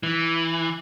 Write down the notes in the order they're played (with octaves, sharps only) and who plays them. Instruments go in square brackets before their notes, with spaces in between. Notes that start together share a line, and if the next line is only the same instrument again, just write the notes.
[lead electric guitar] E3